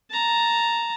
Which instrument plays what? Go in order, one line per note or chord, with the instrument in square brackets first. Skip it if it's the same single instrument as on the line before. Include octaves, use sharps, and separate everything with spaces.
[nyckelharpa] A5 A#5